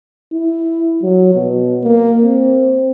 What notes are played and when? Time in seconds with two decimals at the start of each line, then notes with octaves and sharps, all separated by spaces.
0.32 E4
1.03 F#3
1.34 B2
1.83 A#3
2.23 C4